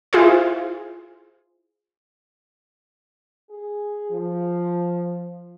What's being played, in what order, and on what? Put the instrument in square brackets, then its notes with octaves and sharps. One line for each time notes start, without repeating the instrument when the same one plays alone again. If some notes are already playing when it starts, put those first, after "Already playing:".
[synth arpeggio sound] E4 F4 G#4 C5
[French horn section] G#4
F3